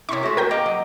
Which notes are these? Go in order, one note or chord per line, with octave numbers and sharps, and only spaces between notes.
C3 A#3 E4 C#5 C6 C#6
G#3 A3 F#4
G#4 A#4 G5 G#5 G6 A#6
A#3 D#5 A#5 D6
F#3 D#5